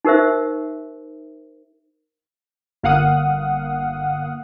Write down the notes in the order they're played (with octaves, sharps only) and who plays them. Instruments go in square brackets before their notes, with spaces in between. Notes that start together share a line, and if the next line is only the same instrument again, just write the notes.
[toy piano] D#4 G4 A#4 C5 E5
[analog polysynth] G1 A#3 F5 F#5 D#6